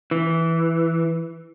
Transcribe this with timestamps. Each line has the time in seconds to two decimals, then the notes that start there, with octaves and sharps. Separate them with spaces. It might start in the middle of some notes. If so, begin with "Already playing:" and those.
0.11 E3